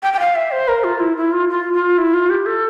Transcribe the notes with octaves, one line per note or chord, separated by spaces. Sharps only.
G5
G5
F5
E5
C5
A#4
F4
E4
E4
F4
F4
F4
E4
F4
G4
A4